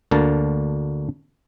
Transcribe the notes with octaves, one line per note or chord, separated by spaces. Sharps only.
D2 D3 A#3 A#4 A5